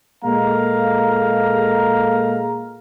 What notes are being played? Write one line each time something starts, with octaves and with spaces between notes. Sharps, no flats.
A#2 G#3 A#3 A4 F5 A#5